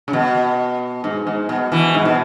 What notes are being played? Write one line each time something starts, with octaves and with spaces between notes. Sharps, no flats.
C#3
B2
G#2
G#2
B2
B2 E3
G#2
B2